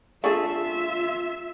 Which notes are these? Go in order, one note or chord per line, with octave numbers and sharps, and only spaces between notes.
A3 D4 F4 G#4 E5